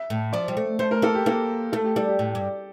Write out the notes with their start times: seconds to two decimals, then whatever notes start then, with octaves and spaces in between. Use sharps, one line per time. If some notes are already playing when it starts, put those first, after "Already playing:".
Already playing: E5
0.10 A2
0.33 F3 D5
0.48 G3
0.57 A3
0.79 A3 C5
0.91 A#4
1.02 A#3 A4
1.15 G4
1.26 A#3 A4
1.73 A3 A4
1.84 G4
1.96 G3 A4
2.08 G4
2.19 A2
2.35 G2